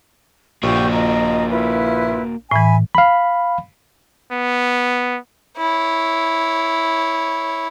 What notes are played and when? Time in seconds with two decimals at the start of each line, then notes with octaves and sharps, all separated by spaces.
0.63 A#1 A#2 A#3 F#4 G4 C#6
0.92 D#5 A#5
1.50 E4 F4 B4
2.51 A2 E3 E5 G#5 B5
2.95 F5 B5
4.32 B3
5.57 E4 C#5